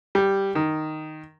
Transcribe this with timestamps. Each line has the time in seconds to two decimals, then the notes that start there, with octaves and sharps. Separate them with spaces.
0.15 G3
0.55 D#3